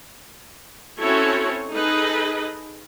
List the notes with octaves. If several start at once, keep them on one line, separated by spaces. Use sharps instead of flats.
C4 C#4 E4 F#4 A4 C#5
D#4 G#4 A4 B4 D#5